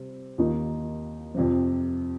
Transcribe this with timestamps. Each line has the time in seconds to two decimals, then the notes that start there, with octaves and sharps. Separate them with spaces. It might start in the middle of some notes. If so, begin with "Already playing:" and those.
Already playing: C3 G3 C4
0.38 D#2 D#3 A#3 D#4
1.34 F2 C3 F3